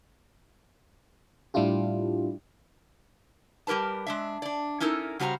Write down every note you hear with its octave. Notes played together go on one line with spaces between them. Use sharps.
A2 G3 D4 E4 F4 G4
G3 G4 A#4 B4 A5
G#3 D4 E5
D4 D5
C#4 D#4 E4 A4 A#4
C#3 G3 F#4 C5 G#5 A#5